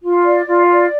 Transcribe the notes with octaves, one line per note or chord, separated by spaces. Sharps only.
F4
D5
F4
D5